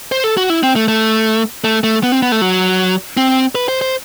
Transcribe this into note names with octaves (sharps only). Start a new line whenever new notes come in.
C5
A4
F#4
E4
C4
A3
A3
A3
A3
B3
C4
B3
A3
F#3
C4
B4
C5
C5